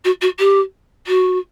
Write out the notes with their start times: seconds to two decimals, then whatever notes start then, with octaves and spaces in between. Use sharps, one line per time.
0.04 F#4
0.21 F#4
0.39 G4
1.07 F#4